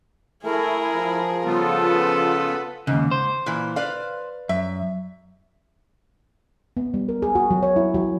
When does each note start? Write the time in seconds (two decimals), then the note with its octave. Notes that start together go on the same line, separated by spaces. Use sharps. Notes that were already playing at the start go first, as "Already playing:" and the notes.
0.44 A3 E4 G#4 A#4
0.96 F3
1.45 C#3 G3 B3 F4 A4
1.80 B4
2.87 D#2 G#2 C#3
3.11 C5
3.46 A#2 E3
3.76 B4 D5 F5
4.49 F#2 E5
6.77 B3
6.94 G3
7.09 A#4
7.22 G#4
7.35 F#4
7.51 F#3
7.63 C#5
7.76 E4
7.94 F#3